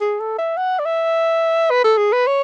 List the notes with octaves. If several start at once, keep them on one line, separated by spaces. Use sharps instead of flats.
G#4
A4
E5
F#5
D5
E5
B4
A4
G#4
B4
C#5